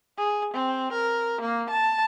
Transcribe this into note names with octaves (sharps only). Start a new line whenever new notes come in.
G#4
C4
A#4
A#3
A5